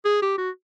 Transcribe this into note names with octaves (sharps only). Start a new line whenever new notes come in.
G#4
G4
F#4